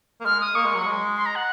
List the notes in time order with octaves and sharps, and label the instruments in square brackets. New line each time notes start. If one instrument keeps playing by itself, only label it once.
[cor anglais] A#3
[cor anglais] G#3 [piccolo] F6
[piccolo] D#6
[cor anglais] A#3 [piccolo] C#6
[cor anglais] G#3
F#3
G#3
[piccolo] C6
A#5
F#5